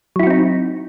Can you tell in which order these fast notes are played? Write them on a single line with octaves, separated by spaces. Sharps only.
F#3 E4 F#4 C4 D#4